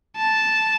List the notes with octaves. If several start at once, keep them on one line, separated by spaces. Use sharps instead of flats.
A5